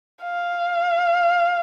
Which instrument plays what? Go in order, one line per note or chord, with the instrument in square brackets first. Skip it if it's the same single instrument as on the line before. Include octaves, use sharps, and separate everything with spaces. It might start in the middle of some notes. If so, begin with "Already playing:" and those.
[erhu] F5